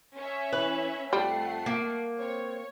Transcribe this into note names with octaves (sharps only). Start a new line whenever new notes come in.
C#4 C#5 E5
E3 B4
F2 G3 A3 F#5 C7
A#3
C4 C#5